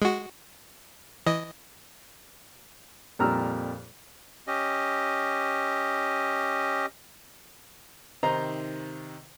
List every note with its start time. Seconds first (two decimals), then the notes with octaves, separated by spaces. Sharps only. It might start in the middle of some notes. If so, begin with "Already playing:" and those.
0.02 G#3 F#4
1.27 E3 D#5
3.19 F2 A#2 G3 A#5 E6 F6
4.48 C#4 G4 D#5
8.23 C3 D#3 D#4 C5 A#5